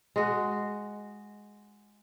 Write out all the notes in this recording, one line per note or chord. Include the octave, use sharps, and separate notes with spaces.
G#3 F#4